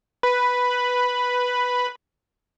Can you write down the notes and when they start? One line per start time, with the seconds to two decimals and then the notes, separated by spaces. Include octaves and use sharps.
0.23 B4 B5